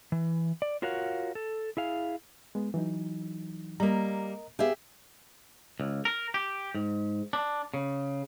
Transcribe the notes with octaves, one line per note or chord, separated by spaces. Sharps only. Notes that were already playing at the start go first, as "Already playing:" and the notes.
E3
D5
F4 F#4 A#4 C#5 F5 F#5
A4
E4 G#4 F5
G#3 B3
E3 F#3 D#4
G3 A#3 A#4 D#5 A#5
B3 G4 G#4 E5 F5
C#2
A#4
G4
G#2
D4
C#3